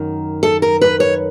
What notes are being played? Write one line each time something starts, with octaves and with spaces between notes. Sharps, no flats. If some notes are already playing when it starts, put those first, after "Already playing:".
Already playing: F#2 D#3
A4
A#4
B4
C#5